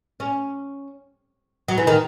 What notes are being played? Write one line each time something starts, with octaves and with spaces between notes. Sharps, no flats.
C#4
F#3
E3
D#3